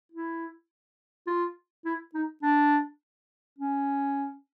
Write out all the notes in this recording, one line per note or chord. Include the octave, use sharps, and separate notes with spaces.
E4
F4
E4
D#4
D4
C#4